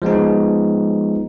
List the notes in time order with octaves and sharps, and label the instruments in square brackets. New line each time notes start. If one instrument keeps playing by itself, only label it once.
[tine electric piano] F3 G#3 B3 D#4